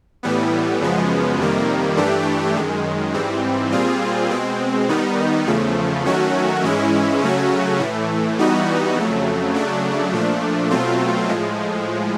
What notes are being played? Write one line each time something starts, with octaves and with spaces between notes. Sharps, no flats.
A2 E3 G3 B3
F#2 C#3 F3 G#3 B3
F2 C3 D#3 G3 A#3
G2 E3 A3 D4 G4
F#2 D#3 G#3
G#2 E3 G3 C4
A#2 G3 C4 F4 G#4
B2 G#3 C4
D#3 G3 B3 D#4
E2 C#3 F3 A3
D#3 F#3 A3 C#4 F#4
G#2 E3 G#3 C#4 E4
C#3 F#3 A3 C#4 F#4
A2 E3 A3
E3 G3 B3 D#4 F#4
F2 C#3 F#3 A3
C#3 F#3 A3 D4
A#2 F3 A3 D4
B2 F#3 A3 C4 F4
A2 F3 G#3